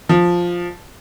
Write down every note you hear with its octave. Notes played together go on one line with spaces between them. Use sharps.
F3